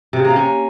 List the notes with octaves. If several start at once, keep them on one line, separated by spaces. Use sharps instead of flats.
C3
C#3
A#3
C3
C#4